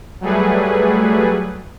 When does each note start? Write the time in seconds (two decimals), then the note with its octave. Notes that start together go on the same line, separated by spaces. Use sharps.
0.21 F#3 G3 A3 G#4 B4